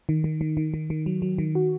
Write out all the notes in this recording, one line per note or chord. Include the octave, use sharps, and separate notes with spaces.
D#3
D#3
D#3
D#3
D#3
D#3
F#3
F#3
D#3
F#4